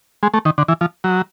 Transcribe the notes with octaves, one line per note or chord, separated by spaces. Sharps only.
G#3
A3
D#3
D3
E3
F3
F#3